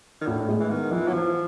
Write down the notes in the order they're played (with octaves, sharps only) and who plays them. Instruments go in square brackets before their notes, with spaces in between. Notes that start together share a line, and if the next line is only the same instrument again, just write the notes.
[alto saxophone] D#3
[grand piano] A2 [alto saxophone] D3
[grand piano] G#3
[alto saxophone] E3
[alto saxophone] D#3 [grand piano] B3
[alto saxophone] E3 [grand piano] F3
[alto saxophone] F#3
[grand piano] E3 [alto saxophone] F3